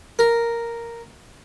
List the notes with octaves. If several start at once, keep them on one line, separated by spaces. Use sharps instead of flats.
A#4